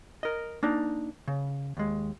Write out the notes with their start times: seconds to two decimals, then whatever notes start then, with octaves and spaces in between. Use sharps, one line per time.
0.23 A#4 D#5
0.63 A#3 D4 D#4
1.28 C#3
1.77 D#2 G#3